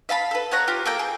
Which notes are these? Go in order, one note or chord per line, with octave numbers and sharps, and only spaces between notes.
E5 F5 A5 B5
A4 B4
B3 C#5 F#5 A#5
F4 G4
A#3 A4 A#4 G5
G#4